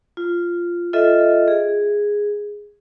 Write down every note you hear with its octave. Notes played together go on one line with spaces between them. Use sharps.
F4
F4 A4 D#5 E5
G#4